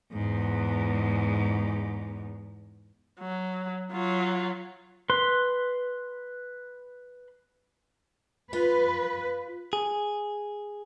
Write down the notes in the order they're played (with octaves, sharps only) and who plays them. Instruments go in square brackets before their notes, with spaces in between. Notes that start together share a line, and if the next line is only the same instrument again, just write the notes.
[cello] E2 G#2
[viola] F#3
F#3 F4
[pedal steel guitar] B4 C6
[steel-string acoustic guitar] F4 [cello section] B4
[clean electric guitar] G#4